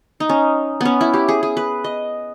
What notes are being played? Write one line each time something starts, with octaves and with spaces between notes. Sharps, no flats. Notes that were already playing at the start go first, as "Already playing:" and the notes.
D#4
C#4
B3 C#4
E4
G4
G#4
G#4
B4
D#5